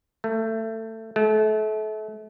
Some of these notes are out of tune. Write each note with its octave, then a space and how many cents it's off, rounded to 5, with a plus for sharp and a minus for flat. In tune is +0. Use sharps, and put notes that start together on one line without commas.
A3 +20
A3 -35